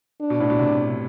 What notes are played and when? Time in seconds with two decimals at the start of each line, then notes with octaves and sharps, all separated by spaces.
0.20 D4
0.30 B2
0.40 A2
0.50 B2
0.59 C3